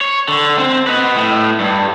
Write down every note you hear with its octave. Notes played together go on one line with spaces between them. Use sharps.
C#5
D3
C4
B4 D#5
A2
G2